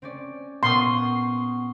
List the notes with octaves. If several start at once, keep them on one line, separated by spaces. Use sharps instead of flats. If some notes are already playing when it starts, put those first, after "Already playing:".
C4 C#4 D5
A#2 B3 C6 C#6 D#6